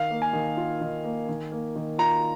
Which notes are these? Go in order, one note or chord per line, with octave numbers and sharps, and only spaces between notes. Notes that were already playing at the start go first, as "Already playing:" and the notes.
Already playing: D#3 F5
A#3
G#5
D#3
F4
D#3
A#3
D#3
A#3
D#3
F4 A#5